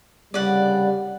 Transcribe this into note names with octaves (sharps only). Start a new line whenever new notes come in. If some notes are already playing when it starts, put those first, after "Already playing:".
C2 C#3 G3 D5 F#5